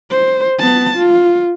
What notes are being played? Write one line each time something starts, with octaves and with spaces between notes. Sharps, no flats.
C5
B3 A5
F4